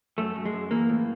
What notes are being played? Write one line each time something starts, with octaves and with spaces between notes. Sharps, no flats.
F#2 A3
F#2
G#3
F#2
E3 A#3
A2